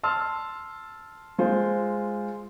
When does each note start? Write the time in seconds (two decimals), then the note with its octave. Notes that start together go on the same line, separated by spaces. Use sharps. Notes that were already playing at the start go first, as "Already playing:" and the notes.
0.04 A5 C6 E6 F6
1.38 G#3 F4 C5